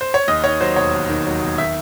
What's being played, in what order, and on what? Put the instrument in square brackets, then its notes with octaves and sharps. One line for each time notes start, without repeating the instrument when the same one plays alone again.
[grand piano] C5
C#5
D#2 D#5
D#3 C#5
F#3 C5
E1 C#5
D#2
D#3
F#3
E1
D#3 E5